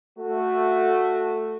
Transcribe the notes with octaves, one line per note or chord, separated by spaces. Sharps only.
A3 F#4 A4